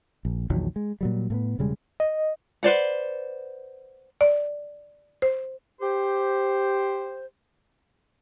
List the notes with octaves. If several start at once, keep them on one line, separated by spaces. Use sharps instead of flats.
A#1
A#1 E2 D#3 F#3
G#3
A#2 F#3 G3
A2 A#3 B3
E1 C#3 G3 G#3
D#5
B4 C5 D5 F#5
D5
C5
G4 C5